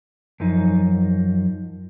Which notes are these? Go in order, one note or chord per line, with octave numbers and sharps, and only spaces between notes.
F#2 F3 D#4